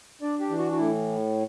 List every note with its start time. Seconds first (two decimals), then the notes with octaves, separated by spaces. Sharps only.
0.22 D4 D5
0.40 G4
0.50 E3
0.58 F#4
0.72 F#4
0.77 A2 E4